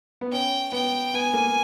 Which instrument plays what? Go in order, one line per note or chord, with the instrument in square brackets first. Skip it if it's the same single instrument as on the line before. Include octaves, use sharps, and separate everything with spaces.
[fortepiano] B3
[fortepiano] C#4 [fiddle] G5
[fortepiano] B3 [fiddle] G5
[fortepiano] B3 [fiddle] G#5
[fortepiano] A#3